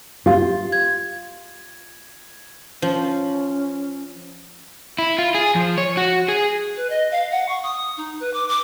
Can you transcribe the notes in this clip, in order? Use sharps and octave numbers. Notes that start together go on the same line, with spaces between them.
F4 G4
G#6
F3 C#4
E4
F4
G#4
F3
C#5
F#4
G#4
B4
D#5
F5
F#5
C#6
D#6
D#4
B4
D6
D6